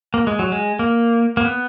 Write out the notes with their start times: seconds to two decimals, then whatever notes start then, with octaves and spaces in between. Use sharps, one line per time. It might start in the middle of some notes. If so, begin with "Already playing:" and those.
0.14 A#3
0.27 G#3
0.39 F#3
0.52 G#3
0.79 A#3
1.37 A#3
1.45 B3